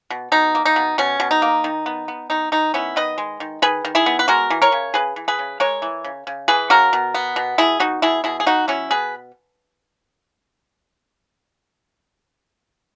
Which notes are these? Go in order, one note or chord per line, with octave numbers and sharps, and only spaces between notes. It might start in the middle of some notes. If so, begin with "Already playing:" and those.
B2
B2 D#4
A#3
D#4
B2
B2 C#4
B2
D#4
A#3
D#3
B3
B3
D#3 D#4
D#3 D#4
B3 C#4 E4
D#3 B4 D#5
G#3
D#3
D#3 G#4 B4
D#3
E4 G#4
B3
B4
G#3 F#4 A#4
E3
A#4 C#5
C#3
C#3 G#4 B4
E3
G#4 B4
C#3
G#3 A#4 C#5
E3
C#3
C#3
E3 G#4 B4
C#3 F#4 A#4
B2
B3
B2
B2 E4 G#4
B2 D#4 F#4
B2 E4 G#4
B2 E4 G#4
G#4
B3 D#4 F#4
F#3 C#4 E4
B2 G#4 B4